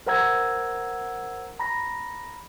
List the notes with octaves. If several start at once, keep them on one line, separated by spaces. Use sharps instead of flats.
A#4 C5 F#5 A#5 E6 G#6
A#5 B5 A#6